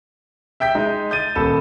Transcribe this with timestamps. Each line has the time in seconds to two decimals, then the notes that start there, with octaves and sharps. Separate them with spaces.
0.60 E5 G5 G6 B6
0.75 G#3 D#4
1.11 G6 A6 D#7
1.35 D#1 A4 B5 E7